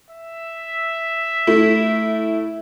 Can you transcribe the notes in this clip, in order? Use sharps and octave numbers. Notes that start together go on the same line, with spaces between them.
E5
A3 E4